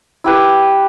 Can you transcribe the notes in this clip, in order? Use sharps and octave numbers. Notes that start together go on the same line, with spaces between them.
E4 G4 B4